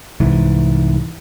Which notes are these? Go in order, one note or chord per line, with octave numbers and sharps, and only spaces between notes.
C2 G#2 E3